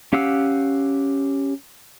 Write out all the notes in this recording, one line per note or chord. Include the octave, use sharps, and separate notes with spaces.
C#4 G4 F5 F#5 E6